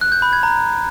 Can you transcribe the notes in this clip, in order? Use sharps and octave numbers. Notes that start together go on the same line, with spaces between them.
F#6
G6
B5
G#6
A#5